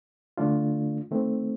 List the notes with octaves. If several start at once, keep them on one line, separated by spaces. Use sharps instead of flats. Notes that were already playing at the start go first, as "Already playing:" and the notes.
D3 A3 D4 F4
D#3 A3 C4